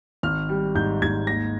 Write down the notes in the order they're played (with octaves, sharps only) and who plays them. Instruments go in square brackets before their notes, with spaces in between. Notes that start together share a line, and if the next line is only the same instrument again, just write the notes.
[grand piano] G#1 F6
G3
G#2 G6
G#2 G#6
D#2 A#6